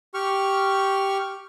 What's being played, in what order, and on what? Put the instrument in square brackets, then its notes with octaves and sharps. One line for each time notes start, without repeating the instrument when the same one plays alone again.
[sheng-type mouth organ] G4 C#6 F6